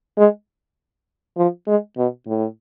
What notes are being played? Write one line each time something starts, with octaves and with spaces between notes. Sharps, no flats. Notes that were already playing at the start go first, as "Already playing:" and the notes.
G#3
F3
G#3
B2
A2